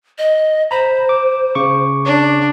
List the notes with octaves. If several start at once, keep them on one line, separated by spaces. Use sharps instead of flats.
D#5
C5 A#5 B5
D6
C#3 C#6 D6
D4